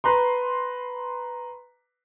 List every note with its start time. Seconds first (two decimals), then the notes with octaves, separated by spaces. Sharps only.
0.04 B4 A#5 C6